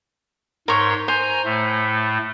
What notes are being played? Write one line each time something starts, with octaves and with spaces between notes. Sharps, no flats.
G#2 A#4 C#5 C6 C#6
C5 G#5 A#5
A2 A3